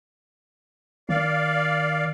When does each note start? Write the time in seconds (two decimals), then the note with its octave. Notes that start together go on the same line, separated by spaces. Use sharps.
1.09 D#3 D5 F5